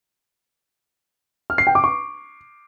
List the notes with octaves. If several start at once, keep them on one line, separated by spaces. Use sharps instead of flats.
F6
C7
G5
D6
C#6